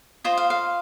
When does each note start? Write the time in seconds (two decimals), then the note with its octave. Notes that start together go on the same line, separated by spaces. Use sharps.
0.24 F4 C5 D#5
0.37 F5
0.50 F5